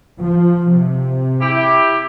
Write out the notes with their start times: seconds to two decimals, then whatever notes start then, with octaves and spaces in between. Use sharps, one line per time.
0.18 F3
0.72 C3
1.42 E4 G4